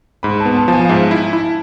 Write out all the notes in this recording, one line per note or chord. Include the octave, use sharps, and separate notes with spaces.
G#2 B5
A5
B3
A5
F3 G#5 A5
F5
G#2 E5
E4
E4